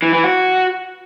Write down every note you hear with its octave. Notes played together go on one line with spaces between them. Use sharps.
E3
E3
F#4